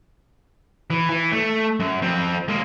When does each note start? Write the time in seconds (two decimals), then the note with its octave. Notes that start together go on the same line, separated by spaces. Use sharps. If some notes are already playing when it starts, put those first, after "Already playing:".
0.90 E3
1.10 E3
1.32 A3
1.80 F#2
2.02 F2 C4
2.48 G#3 A#3